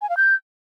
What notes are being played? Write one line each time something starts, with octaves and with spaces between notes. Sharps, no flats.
G#5
F5
G6